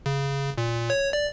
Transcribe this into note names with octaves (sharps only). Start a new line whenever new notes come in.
C#3
A#2
C#5
D5